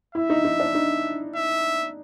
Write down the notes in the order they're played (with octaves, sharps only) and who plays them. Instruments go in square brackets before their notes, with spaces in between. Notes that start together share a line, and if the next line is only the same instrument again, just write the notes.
[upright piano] E4 [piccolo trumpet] E5
[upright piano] D#4
D#4
D4
D#4
[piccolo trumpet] E5